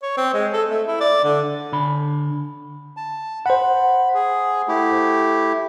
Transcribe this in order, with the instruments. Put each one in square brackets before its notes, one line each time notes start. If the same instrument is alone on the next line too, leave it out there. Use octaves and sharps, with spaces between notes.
[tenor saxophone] C#5
C4
G#3
A4
A3
E4
D5
D3
[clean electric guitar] D3 B5
[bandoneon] A5
[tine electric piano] C5 F#5 [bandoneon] B5
[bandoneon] G#4
A3 E4 G4